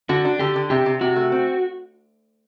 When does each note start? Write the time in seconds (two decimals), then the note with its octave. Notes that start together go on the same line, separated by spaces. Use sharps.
0.09 D3 F#4
0.25 D4
0.39 D3 G4
0.56 D3
0.70 C3 G4
0.86 C3
1.01 C3 F#4
1.16 A3
1.32 C4